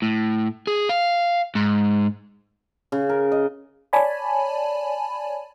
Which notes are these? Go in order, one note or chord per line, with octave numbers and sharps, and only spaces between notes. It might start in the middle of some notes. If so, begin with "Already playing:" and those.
A2
G#4
F5
G#2
C#3
A#4
D#5
C#5 D5 G#5 A5 B5